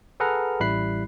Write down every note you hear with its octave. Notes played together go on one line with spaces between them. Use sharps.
G#4 A4 B4 F#5 A#5 F6
A1 G3 E4 B5 F#6 C7